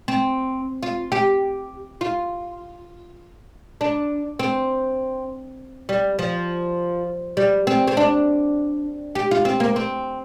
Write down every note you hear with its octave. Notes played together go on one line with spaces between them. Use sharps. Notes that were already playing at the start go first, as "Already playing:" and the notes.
C4
F4
G4
F4
D4
C4
G3
F3
G3
C4
C4
D4
G4
F4
C4
A#3
C4